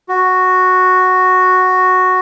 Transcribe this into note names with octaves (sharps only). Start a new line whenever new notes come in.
F#4